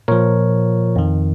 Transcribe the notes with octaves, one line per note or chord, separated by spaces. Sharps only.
A#2 F3 A#4 C#5
F2 D#3